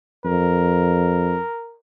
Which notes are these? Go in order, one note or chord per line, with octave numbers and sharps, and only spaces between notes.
F2 A#4